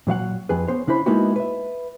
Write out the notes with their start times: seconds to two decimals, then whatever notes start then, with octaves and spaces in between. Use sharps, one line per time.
0.07 A#2 F#3 F5 F#5
0.49 F2 G#4 B4
0.67 B3 C5 C#5
0.87 C#3 D4 E4 C5 B5
1.06 G#3 A#3 B3 D#4 E4 F#4
1.36 B4 E5